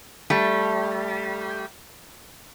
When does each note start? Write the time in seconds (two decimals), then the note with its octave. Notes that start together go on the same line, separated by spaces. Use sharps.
0.30 G3 A3